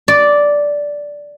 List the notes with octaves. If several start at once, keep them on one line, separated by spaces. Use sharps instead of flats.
D5